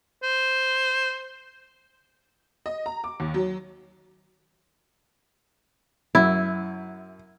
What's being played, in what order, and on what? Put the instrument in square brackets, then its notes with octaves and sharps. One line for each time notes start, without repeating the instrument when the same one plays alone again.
[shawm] C5
[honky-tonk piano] D#5
A#5
D6
D#2
F#3
[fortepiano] F#2 [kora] E4